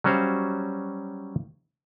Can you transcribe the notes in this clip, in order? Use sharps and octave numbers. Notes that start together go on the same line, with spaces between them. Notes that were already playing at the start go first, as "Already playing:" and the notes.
F#3 G3 C#4 F#4 C5 F5